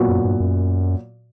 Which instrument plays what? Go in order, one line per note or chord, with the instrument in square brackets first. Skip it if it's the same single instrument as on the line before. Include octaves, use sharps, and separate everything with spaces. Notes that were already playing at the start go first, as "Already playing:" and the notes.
Already playing: [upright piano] A#2 F#3 B3 F#4
[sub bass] F#2
G2
F#2